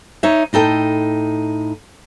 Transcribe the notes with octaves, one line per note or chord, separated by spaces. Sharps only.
D#4 C#5 E5
A2 D#4 A4 G5